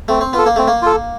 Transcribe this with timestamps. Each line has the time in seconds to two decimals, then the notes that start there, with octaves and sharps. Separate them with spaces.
0.08 A3 C4
0.21 C4
0.33 B3 F4 A4
0.46 A#3
0.56 A3 C4
0.68 A#3
0.82 F4 A4